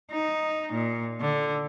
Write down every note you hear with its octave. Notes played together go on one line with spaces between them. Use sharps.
D#4
A#2
D3